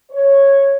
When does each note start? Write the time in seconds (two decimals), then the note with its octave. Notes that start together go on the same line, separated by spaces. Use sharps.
0.11 C#5